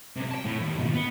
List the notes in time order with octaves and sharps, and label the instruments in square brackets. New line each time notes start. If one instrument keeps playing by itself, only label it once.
[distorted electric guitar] B1 C3
G5 A5
A2
D#2
G#2 B2
B3